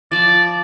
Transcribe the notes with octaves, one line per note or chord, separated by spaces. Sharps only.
F3 D5